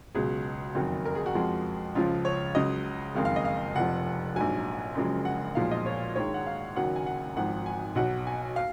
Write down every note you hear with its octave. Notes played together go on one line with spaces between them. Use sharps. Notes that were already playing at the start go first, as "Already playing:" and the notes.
C#2 B2 F#3 G#4
F#1 F2 D#3 F#3
A#4
G#4
F#4
F2 F3 G#3
C#2 C#3 F3 F4
C#5
C#2 C#3 F#3 D#5
F#1 F2 D#3 G#3 F5
F5
D#5
F5
F1 F2 F3 F#5
A#1 G#2 F#3 G#5
F#1 F#2 C#3 F3 G#3
F#5
B1 A#2 F3 G#3 F5
D#5
C#5
A#1 G#2 D#3 G#3 C#5
F#5
F5
F#1 F#2 D#3 F#3 F#5
G#5
F#5
G#1 G#2 F3 F#5
G#5
B1 B2 F#3 F#5
G#5
F5